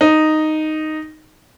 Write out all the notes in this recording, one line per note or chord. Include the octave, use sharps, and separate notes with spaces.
D#4